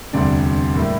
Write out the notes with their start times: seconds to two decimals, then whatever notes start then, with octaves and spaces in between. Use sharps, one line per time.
0.13 E1 D2 C3 G3 D4
0.75 A2 G3 A#3 E4